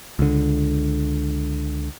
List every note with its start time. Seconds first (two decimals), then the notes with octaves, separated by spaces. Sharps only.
0.19 C#2 D3